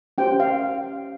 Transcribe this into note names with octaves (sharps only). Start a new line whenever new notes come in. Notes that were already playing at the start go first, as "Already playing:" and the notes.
C#4 G4 C5 G5
F5